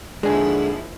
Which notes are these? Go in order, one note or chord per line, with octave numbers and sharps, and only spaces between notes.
D#2 D3 F3 G#3 D4 E4 G#4